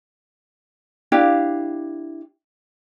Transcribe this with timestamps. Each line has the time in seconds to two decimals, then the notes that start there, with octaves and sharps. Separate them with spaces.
1.12 D4 E4 G4 F5